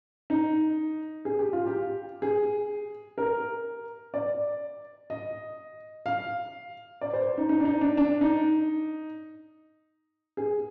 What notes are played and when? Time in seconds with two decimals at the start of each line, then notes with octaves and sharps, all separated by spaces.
0.30 D#4
1.25 G#4
1.39 G4
1.53 F4
1.66 G4
2.22 G#4
3.18 A#4
4.14 D5
5.10 D#5
6.06 F5
7.01 D5
7.13 C5
7.38 D#4
7.49 D#4
7.60 D4
7.65 D#4
7.81 D4
7.97 D4
8.21 D#4
10.37 G#4